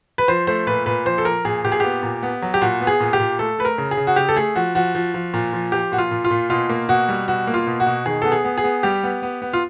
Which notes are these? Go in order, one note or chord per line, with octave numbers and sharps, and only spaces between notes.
B4
F3 C5
A3 C5
A#2 B4
A#2 B4
F3 C5
A4
F3 A#4
A#2 G#4
A#2 G4
G#4
B3 G4
A#2
B3
F#3
G4
A#2 F#4
B3
G#4
A#2
G4
A#2
A3 A4
A3 B4
A#4
C#3
G#4
C#3
F#4
C#3 G4
A4
A3 G#4
F3 F#4
F3 F#4
F3
F3
A#2
F3
F3 G4
A#2 F#4
F4
A#2
F4
A#2
B2 F4
A#3
B2 F#4
G3
B2 F#4
A#3
F4
B2
F#4
B2
D#3 G#4
B3 A4
G#4
B3
G#4
B3
G3 G4
B3
B3
B3
F4